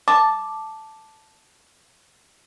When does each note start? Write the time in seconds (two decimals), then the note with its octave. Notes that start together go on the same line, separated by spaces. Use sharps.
0.08 A5 D6